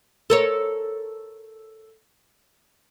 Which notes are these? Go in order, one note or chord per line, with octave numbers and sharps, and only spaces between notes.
A4 A#4 C#5